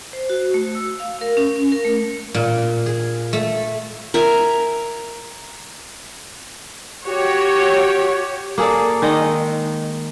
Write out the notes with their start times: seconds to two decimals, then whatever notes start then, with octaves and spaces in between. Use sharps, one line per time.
0.13 C5
0.30 F#4
0.54 A3
0.75 E6
1.00 F5
1.21 A#4
1.37 C#4
1.56 C#4
1.72 A#4
1.85 A3
2.34 A#2
2.86 G#4
3.33 A3
4.14 A#4 E5 G#5
7.07 F#4 G4 C#5
8.58 A#3 G#4 A4 D5
9.02 D#3 G#3 D#5